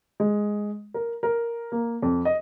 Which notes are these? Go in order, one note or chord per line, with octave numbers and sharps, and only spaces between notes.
G#3
A#4
A#4
A#3
F2
D#5